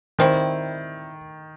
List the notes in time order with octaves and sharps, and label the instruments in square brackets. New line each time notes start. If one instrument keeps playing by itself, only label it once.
[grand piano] D#3 [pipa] G3 C4 E4